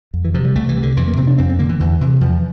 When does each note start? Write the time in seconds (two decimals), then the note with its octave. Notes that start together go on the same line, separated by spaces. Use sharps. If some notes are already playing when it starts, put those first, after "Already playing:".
0.14 F2
0.25 E3
0.34 C3 F3
0.45 G3
0.55 C2 A3
0.69 E3
0.77 C3
0.83 D3
0.97 F2 E3
1.08 A#3
1.17 C3 C4
1.27 D4
1.38 F2 C4
1.49 C4
1.59 D3 A#3
1.69 E3
1.80 E2 E3
2.01 C3 E3
2.21 E2 F3